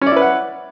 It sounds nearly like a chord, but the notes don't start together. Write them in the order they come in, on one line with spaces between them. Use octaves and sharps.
C#4 D5 E4 B4 F#5